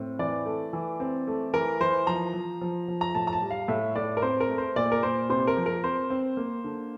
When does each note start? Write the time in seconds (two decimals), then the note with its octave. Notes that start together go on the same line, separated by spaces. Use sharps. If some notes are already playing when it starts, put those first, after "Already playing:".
Already playing: A2 C4
0.19 E3 D5
0.46 A3
0.73 E3
1.00 C4
1.27 A3
1.53 E3 A#4
1.80 E3 C5
2.07 F3 A#5
2.34 F3
2.61 F3
2.88 F3
3.01 A#5
3.15 A2 A5
3.27 A#5
3.33 A5
3.42 G3
3.51 F5
3.68 A2 E5
3.96 A2 D5
4.17 A#4
4.22 C4 C5
4.40 A#4
4.49 A3
4.58 C5
4.76 A#2 D5
4.92 A#4
5.03 A#2 C5
5.29 C3 C5
5.47 A#4
5.57 F3
5.66 A#4
5.84 C4 C5
6.10 C4
6.37 A#3
6.64 D3